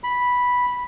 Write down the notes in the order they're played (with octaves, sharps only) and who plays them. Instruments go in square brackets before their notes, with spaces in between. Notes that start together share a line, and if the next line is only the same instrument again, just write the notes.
[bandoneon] B5